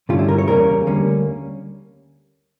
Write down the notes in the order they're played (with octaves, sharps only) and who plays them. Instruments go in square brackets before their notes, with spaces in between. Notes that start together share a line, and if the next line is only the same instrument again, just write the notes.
[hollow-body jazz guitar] G2 D3 G3 C#4 F4
E4
A#4
C#5
E2 C#3 G3 A#3 C#4 A#4
D2 D3 G3 A#3 C#4